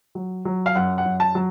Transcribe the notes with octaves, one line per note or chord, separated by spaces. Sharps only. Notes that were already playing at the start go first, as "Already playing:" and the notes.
F#3
F#3
F5
F#2 F#5
F#5
F#2
A5
F#3